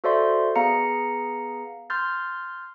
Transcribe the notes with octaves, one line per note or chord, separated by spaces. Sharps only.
F#4 A4 C5 D5 E5 C6
B3 G#4 F5 A#5 C#7
C6 F6 G6 A6